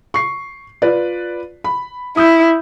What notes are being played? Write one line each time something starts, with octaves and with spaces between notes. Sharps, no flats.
C#6 C7
F4 B4 D5
B5
E4 D#6 E6 G6